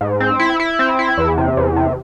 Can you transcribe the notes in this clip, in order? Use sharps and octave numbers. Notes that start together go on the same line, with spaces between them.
G#2
C4
E4
E4
C4
E4
E2
C3
E2
C3